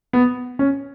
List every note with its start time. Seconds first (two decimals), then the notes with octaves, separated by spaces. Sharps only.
0.13 B3
0.59 C#4